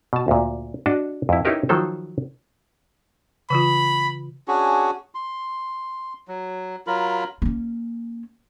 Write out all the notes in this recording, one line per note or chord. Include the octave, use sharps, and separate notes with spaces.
B2 A5
D2 A#2
D4 F#4 D#5 A5
F2 E4
C#4 D#4 E4 G4 A#4 B4
D#3 F3 F#3 A4 C5
C#3 E3 F4 B5
C#4 D4 F#4 G#4
C6
F#3
F#3 F4 A#4 B5
A#3 C#4